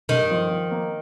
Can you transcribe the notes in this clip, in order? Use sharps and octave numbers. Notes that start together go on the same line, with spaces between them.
G2 D#3
F3
F3
A#3